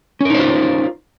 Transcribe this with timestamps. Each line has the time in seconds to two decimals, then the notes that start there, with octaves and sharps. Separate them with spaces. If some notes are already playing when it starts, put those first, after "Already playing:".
0.21 C#4
0.25 A#4
0.30 D#4
0.35 C5
0.39 F4